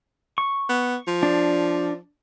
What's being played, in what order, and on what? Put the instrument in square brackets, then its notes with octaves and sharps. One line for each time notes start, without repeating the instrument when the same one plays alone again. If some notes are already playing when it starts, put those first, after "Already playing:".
[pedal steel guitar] C#6
[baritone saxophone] B3
F3
[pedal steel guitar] D4